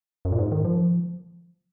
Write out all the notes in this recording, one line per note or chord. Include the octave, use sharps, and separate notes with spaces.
F#2
A#2
G#2
D#3
F3